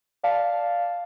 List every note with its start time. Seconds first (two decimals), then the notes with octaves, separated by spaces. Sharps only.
0.23 D5 F5 A5